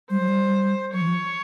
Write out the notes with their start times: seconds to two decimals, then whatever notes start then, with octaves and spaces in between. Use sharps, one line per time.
0.10 G3 C5
0.20 F#3
0.28 G3
0.93 F#3 C#5
1.01 E3
1.07 F3